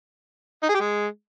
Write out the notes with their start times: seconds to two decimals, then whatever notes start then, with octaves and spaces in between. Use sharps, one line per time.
0.63 D#4
0.69 G#4
0.74 G4
0.80 G#3